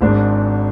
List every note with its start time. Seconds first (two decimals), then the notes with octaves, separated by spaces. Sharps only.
0.01 G#1 G#2 G#3 D4